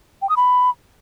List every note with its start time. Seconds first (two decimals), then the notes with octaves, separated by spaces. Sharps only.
0.22 G5
0.29 D#6
0.37 B5